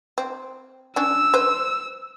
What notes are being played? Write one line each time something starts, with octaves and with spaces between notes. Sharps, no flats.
C4
C#4 D4 E6
B4 C5